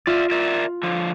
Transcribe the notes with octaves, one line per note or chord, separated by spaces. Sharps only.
F4 D5 E5
A#4 D5 E5
D3 F3